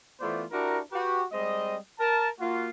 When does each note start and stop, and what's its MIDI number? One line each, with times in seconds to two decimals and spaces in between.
0.20 0.43 52
0.20 0.43 57
0.20 0.43 59
0.20 0.43 65
0.20 0.43 72
0.20 0.43 74
0.51 0.79 62
0.51 0.79 64
0.51 0.79 66
0.51 0.79 67
0.51 0.79 70
0.92 1.22 66
0.92 1.22 67
0.92 1.22 71
1.32 1.76 55
1.32 1.76 56
1.32 1.76 60
1.32 1.76 75
1.99 2.28 70
1.99 2.28 81
2.39 2.69 58
2.39 2.69 65
2.39 2.69 66